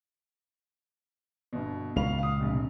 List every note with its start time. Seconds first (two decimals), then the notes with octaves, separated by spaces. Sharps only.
1.53 G1 B2
1.96 C#2 A#2 F5 F7
2.19 F5 D#6
2.40 F1 A#1